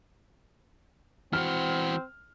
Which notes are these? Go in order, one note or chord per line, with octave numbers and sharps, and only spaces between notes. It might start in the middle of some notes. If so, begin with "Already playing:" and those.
E3 C4 F#4 F6